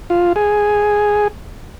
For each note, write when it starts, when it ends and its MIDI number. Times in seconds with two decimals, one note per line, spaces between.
0.10 0.33 65
0.36 1.28 68